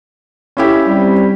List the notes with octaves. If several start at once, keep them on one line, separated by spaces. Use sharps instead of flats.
C#4 E4 G4
G3 C4